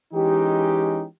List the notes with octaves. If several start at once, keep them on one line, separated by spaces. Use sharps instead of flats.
E3 G#3 C#4 D#4 G4